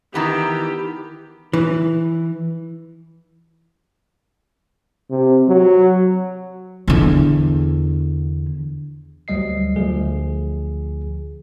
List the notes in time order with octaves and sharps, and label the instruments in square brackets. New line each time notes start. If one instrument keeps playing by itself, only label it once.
[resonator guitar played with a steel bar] D#3 E3 B3 [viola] G4
[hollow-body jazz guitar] E3
[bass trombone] C3
F#3
[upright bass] E2 D3
[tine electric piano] D2 F#3 G3 D#5 C7
D2 F3 G#4